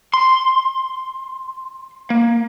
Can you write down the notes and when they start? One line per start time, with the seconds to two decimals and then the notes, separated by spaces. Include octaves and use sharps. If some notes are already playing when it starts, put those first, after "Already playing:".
0.14 C6
2.10 A#3